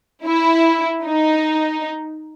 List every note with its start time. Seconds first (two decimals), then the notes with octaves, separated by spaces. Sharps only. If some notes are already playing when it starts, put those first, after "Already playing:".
0.25 E4
1.04 D#4